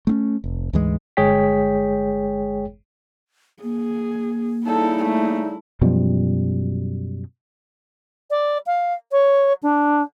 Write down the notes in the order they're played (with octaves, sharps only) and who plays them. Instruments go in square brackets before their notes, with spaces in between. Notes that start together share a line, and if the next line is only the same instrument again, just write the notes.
[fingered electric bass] A3 C4 C#4
F1
D2 G#2 E3 G#3
[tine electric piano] G1 G#3 G#4 C#5 G5 B6
[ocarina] A#3 [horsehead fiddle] G#4
[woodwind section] C#3 G3 D#4 [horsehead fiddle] E4 [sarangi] A4
[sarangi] A3
[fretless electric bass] F#2 B2 F3 G3
[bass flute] D5
F5
C#5
D4